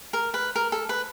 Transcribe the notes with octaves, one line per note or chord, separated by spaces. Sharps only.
A#4
B4
A#4
A4
B4